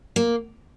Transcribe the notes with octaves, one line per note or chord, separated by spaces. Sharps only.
A#3